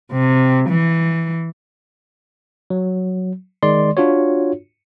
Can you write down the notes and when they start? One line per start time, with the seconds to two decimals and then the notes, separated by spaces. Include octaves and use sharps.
0.12 C3
0.70 E3
2.70 F#3
3.63 D#3 G#3 D5 C6
3.97 D4 F4 F#4 C#5